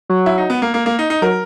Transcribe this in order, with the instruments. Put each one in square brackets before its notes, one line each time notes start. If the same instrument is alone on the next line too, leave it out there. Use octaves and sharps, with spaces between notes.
[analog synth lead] F#3
[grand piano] E4
D#4
B3
A#3
A#3
A#3
D#4
D#4
[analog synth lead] F#3 [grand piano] A#4